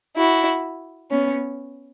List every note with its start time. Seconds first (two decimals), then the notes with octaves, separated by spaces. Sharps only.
0.16 E4 F#4
1.10 B3 C#4